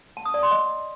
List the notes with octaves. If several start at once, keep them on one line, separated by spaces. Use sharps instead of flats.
A5
D#6
D5
C6
D#5